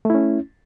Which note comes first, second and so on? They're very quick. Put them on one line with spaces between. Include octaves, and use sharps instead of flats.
A3 E4 C#4